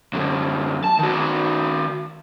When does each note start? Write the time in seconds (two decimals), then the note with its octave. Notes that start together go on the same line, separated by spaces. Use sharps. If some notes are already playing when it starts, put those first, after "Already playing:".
0.13 F#2 D3
0.84 A5
0.99 D#3 F#4